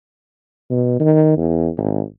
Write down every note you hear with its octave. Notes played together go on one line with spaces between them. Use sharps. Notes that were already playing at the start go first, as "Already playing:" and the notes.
B2
D#3
E2
G#1